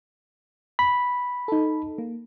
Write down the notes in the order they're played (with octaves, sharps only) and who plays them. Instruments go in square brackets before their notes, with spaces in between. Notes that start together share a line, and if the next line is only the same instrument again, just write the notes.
[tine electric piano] B5
[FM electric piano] D#4 A4
A#3